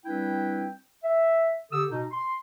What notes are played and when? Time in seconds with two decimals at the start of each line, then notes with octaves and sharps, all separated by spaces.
0.05 G3 C4 D4 E4 B4 G5
1.04 E5
1.72 D3 G4 A4 D#6 E6
1.91 B2 D#4
2.11 C6